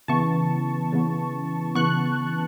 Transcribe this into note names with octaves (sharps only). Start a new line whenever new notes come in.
C#3 E3 B3 A5 C#6
C#3 E3 B3
C#3 E3 B3 C#6 F#6